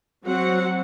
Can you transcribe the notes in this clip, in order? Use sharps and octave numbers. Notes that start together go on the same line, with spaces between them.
F#3 C4 F#4 F#5